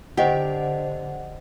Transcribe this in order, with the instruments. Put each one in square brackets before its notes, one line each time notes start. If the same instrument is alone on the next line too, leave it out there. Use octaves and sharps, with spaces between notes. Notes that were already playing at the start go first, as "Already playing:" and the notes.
[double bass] D3 [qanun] G4 [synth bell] C5 D#5 F#5